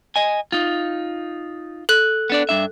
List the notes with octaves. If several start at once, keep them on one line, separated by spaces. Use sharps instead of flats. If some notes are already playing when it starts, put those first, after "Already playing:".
D#5 G#5
D#4 F4
A4 F#6
B3 D4 D5
G2 D4 E5